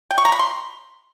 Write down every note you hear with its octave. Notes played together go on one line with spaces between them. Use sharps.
G5
C#6
A#5
B5
C6